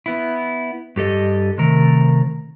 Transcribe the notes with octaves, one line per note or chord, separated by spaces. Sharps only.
B3 E4
G2 G4 A4 D#5
C3 D#3 A3 A#4